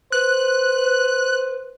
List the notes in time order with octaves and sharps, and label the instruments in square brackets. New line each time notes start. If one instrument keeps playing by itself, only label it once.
[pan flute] B4 [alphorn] C5 [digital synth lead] F#6